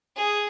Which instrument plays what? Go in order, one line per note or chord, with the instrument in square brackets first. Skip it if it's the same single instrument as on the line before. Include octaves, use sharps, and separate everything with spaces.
[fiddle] G#4